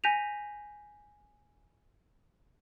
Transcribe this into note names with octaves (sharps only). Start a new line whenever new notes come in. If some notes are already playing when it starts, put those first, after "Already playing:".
G#5 G6 A#6 B6 D#7 F7